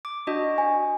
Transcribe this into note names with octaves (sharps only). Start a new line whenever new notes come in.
D6
D4 F#4 D#5
G#5